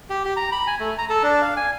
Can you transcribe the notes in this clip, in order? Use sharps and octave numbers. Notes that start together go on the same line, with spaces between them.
G4
G4
A#5
B5
G#5
A3
A#5
A4
D4
F5
G#5